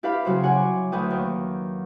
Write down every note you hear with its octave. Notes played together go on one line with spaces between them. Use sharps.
E4 G4 B4 D5 F5 B5
C#3 F#3 F#4 C5
C#5 F#5 G#5 C6 D6
D2 F#3 B4 G5 D#6
D#2